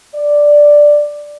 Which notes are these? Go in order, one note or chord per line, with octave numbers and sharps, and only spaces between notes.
D5